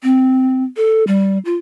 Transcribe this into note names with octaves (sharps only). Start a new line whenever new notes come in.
C4
A4
G3
F4